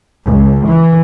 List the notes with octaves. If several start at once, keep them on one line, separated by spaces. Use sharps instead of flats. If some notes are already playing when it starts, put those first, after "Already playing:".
C#2
E3